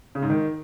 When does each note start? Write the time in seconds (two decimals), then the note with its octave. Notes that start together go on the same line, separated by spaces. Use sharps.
0.15 C#3
0.22 G#2
0.30 D#3